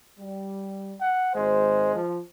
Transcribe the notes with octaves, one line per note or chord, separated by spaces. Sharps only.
G3
F#5
G#1 G#3 C5
F3